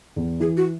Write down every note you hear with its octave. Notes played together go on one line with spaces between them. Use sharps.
E2
E3 G#4
F#4